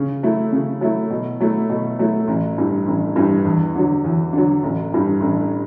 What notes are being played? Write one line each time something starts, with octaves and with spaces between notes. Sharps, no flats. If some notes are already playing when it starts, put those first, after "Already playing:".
Already playing: C#3
F#3 A3 E4
C#3
F#3 A3 E4
B2
F#3 A3 E4
B2
F#3 A3 E4
A1
G2 E3
A1
G2 E3
E2
D3 F#3
E2
D3 F#3
A1
G2 E3
A1